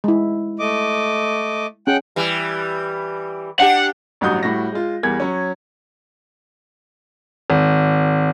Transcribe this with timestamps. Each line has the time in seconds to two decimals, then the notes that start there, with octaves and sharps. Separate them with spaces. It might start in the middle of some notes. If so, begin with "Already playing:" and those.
0.04 G#3 E4
0.59 A3 D#5 D6
1.87 C#4 G#4 F#5 G5 F#6
2.16 E3 G3
3.60 D4 G4 F#5
4.21 A1 G2 F#3 F#4 D#6 G6
4.43 A2 G3 F#4 A#6
4.72 G#3 F4
5.03 E2 G3 A#4 G#6
5.20 F#3 C#4
7.50 G#1